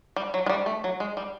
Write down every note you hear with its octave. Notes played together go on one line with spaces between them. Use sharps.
G3
F#3
G#3
G3
A3
F#3
G#3
G3